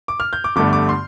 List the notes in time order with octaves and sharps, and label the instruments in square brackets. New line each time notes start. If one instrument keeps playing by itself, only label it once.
[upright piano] D6
F6
G6
D6
G1 G2 D3 A3 D6
D6
C6